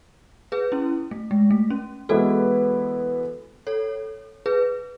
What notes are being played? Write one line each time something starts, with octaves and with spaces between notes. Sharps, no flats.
G#4 B4
C#4 E4
A3
G#3
A3
C#4
E3 G#3 B3 E4 F#4 A4 B4
A4 C#5
G#4 B4